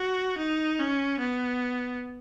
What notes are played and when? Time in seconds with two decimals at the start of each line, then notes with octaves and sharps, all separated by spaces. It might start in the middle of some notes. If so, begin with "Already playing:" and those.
Already playing: F#4
0.38 D#4
0.79 C#4
1.20 B3